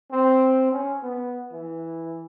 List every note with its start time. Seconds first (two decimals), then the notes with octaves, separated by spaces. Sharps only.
0.11 C4
0.72 C#4
1.03 B3
1.52 E3